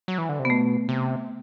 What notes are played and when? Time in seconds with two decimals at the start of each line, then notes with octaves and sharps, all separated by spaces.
0.08 F#3
0.18 E3
0.29 D3
0.39 C3
0.45 B3
0.50 B2 A3
0.89 C3